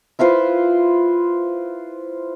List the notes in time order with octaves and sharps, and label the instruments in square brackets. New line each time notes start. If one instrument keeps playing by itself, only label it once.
[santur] E4 F4 B4 C5